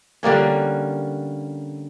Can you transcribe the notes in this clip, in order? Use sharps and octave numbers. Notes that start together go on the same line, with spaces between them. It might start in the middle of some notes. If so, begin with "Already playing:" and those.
D3 G3 A#3 C#4